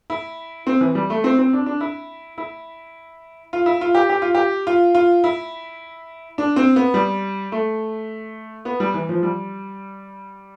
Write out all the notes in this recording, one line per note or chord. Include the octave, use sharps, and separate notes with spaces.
E4
C4
E3
G3
A3
C4
C4
D4
D4
E4
E4
F4
E4
F4
G4
G4
F4
G4
F4
F4
E4
D4
C4
B3
G3
A3
B3
G3
E3
F3
G3